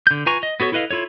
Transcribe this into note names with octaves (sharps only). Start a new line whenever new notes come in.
D3 G6
F4 B4 G#5 A#5 C#6
D#5
B3 F#4 A4 C#5
E4 A4 B4 D#5 F5
E4 F4 A4 C#5